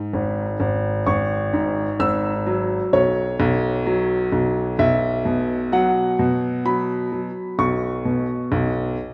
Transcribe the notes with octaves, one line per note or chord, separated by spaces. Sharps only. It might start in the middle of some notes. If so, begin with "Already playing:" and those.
Already playing: G#2
G#1
G#1
G#1 C#6
G#2
G#1 E6
F#3
B1 C#5
B1
F#3
B1
B1 E5
B2
F#3 F#5
B2
F#3 B5
F#3
B1 C#6
B2
B1